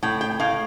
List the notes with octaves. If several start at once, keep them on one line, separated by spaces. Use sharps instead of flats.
A2 G5
G5
A2 F5